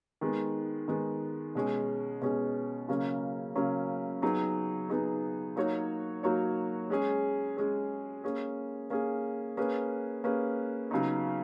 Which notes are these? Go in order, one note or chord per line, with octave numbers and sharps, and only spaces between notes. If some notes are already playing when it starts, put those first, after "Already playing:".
D#3 G#3 B3
D#3 G#3 B3
B2 G#3 C#4 G#4
B2 G#3 C#4 G#4
C#3 F#3 A#3 C#4
C#3 F#3 A#3 C#4
F#3 B3 D#4 G#4
F#3 B3 D#4 G#4
F#3 A#3 D#4 F#4 C#5
F#3 A#3 D#4 F#4 C#5
G#3 C#4 G#4
G#3 C#4 G#4
A#3 C#4 G#4
A#3 C#4 G#4
A#3 C#4 G#4 B4
A#3 C#4 G#4 B4
C#3 F#3 B3 D#4